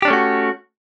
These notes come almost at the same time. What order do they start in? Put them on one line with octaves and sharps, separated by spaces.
G4 D4 C#4 A3 F#4